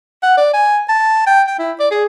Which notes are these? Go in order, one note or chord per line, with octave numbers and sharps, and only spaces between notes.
F#5
D5
G#5
A5
G5
G5
E4
D5
G#4